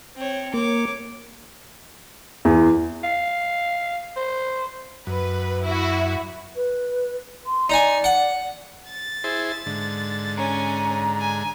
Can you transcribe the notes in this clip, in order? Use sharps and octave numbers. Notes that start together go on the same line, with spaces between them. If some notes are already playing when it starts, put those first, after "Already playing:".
C4 C#5
A#3 C#5 D6
E2
F5
C5
F#2 B4
E4 F#4
B4
C6
D#4 D5 G#5
F#5
A6
E4 G#4 C5
G#2 D3
C#4 G#5 A#5
G#5